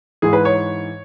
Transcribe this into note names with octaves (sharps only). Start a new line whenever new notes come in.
G#2 E3 G#4
B4
C#5